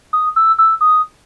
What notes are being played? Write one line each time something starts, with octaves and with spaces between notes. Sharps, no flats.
D#6
E6
E6
D#6